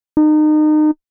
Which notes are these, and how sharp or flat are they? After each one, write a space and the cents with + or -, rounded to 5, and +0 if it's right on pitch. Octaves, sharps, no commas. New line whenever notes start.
D#4 -30